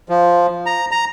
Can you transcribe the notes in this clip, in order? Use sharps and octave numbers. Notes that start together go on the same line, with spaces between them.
F3
A#5
A#5